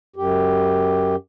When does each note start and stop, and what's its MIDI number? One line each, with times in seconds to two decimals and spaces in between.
0.16 1.16 42
0.16 1.16 67